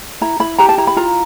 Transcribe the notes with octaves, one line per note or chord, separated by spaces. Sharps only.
E4 A#5
E4 B5
G4 A#5
A5
E4 A#5
B5
F4 A#5